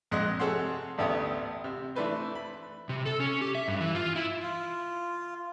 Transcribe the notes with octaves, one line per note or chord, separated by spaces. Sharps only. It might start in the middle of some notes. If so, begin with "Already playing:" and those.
A#1 F2 G#3 D#5 C6 F#6
C3 G#4 A4 C#5 F#5 C6
A1 D2 A3 B3 G4 D#6
C3
E3 A3 D4 A4 B4 C5
B5
C3
A4
C#4
G4
E5
G2
E3
F4
E4
F4